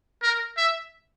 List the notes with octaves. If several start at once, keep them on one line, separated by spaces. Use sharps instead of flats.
A#4
E5